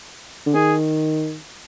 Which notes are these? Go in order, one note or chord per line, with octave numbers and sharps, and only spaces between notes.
D3
D#3 G#4